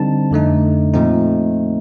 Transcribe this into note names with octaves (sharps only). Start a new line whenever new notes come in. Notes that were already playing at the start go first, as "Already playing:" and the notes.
Already playing: D3 G3 C4 D#4 A5
F2 D3 A3 D#4
A#2 F3 A3 C4 D#4